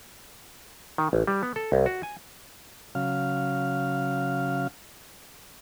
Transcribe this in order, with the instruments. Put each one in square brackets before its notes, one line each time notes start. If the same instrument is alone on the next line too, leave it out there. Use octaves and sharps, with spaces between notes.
[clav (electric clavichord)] D#3
A1
G3
B3
A4
C2
F#4
G#5
[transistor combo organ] C#3 F#3 F5